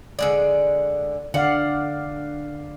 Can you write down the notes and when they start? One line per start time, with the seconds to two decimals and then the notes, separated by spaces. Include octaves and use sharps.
0.19 D3 G#3 D5
1.34 D3 D5 F5 F#5